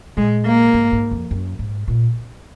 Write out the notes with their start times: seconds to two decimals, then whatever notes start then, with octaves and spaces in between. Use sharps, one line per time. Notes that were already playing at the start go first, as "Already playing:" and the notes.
0.17 A#2 G#3
0.45 A#3
0.74 G#2
0.92 G#2
1.11 F2
1.31 F#2
1.59 G#2
1.88 A#2